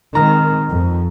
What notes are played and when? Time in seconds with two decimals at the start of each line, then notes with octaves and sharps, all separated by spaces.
0.15 D#3 G#3 C4 A#5 F6
0.69 F2